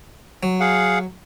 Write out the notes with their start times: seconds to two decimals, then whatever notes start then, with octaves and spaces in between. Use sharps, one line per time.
0.43 F#3
0.60 G#4 F5 F#5